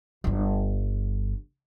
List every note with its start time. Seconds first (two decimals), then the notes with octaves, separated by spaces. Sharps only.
0.24 G1 G3